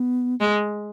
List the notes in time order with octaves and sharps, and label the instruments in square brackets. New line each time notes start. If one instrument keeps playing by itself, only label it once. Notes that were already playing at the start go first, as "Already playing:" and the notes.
Already playing: [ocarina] B3
[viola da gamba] G#3